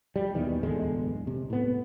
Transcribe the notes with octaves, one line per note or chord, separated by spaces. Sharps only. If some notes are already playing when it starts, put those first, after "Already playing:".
G3
D#2 B2 D#3 E3
D1 E2 D3 G#3
C3
A2 B3